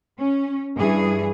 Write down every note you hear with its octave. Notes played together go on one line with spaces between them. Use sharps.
C#4
G2 E3 G#4